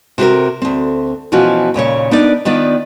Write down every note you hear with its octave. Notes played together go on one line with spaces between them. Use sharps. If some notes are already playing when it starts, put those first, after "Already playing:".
C3 F#4 G4 A#4
D2 C4
B2 E3 F3 C#4 F4 F#4
D#2 A#2 C#3 C#5
B3 D4 D#4 A#4 D5
D#3 B3 D4 F4 D5